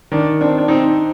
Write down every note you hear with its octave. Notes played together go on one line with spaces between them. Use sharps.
D#3 D4
C4 D4
D4
C4 D#4